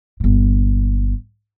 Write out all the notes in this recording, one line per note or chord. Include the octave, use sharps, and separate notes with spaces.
G1 A#2